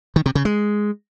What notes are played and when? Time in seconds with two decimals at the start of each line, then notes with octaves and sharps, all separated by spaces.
0.16 D#3
0.26 C3
0.35 C#3
0.45 G#3